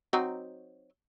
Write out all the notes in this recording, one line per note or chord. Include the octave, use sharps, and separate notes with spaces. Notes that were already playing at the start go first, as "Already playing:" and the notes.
F#3 C4 D#4